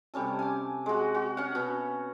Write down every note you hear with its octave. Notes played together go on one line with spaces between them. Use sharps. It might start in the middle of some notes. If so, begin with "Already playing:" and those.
C3 G3 C#4 A4
G#5 D6
G#3 F#4
F#4
C#4 F#5
B2